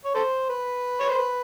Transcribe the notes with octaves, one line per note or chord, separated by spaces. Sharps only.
C#5
A4 C5
B4
C#5
C5
B4